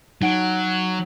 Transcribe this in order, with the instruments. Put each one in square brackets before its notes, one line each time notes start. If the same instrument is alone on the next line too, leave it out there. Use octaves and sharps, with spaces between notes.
[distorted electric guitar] F#3 [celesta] D#4 F#5 D7